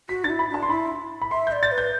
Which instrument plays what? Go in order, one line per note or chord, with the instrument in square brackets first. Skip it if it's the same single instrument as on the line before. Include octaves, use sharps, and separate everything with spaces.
[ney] F#4 [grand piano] B6
[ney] D4 [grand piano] A6
[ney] E4
[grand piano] B5
[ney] D4 [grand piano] A5
[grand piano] C6
[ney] E4 [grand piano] B5
[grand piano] B5
[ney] E5 [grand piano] C6
[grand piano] G6
[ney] D5
[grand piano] A6
[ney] B4
[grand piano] G6